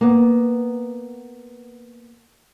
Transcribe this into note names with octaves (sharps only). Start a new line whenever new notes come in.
A#3 B3